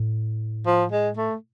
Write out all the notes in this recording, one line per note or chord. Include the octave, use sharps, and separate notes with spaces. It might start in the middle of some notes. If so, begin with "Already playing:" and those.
Already playing: A2
F3
G#3
A3